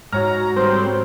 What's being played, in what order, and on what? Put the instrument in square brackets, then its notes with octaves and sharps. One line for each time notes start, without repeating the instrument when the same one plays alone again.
[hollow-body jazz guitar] G#2 [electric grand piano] F#4 C#5 F6 [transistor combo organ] A#5
[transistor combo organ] G3 C4 [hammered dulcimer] C5